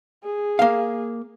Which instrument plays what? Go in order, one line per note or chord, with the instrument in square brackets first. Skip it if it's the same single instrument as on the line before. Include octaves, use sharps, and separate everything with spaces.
[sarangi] G#4
[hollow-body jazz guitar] A#3 F5